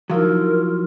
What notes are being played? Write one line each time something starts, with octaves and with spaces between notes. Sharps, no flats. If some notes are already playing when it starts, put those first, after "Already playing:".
F3 F#3 D#4 E4 A#4 C6